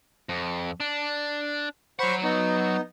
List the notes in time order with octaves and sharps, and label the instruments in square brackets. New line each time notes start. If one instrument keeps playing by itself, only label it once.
[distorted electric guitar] F2
D4
[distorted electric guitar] F#3 F#5 [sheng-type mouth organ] C5 B5 C#6
[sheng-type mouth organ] B3 D#4